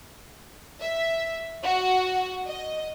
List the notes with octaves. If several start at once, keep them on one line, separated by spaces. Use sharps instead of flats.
E5
F#4
D#5